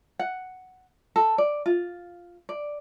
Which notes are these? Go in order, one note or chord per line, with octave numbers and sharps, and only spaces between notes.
F#5
A4
D5
F4
D5